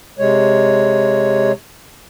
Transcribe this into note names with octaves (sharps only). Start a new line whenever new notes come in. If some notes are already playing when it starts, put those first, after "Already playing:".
C3 G#3 C#5